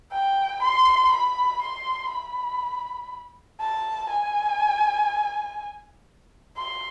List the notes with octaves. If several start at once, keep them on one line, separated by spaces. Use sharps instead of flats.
G5
C6
B5
C6
B5
A5
G#5
C6